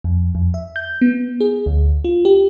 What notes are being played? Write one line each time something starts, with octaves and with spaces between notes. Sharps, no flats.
F2
F2
E5
G6
B3
G#4
D2
F4
G4